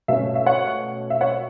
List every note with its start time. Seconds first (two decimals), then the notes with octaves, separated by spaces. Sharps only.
0.08 B2 A3 C#4 E5
0.35 E5
0.46 C#5 F#5
1.10 E5
1.21 C#5 F#5